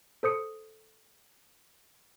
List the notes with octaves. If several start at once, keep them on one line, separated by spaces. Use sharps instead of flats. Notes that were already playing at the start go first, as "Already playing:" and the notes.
A4 C5 D#6 C#7